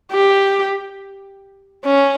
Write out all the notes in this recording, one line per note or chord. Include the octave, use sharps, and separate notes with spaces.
G4
C#4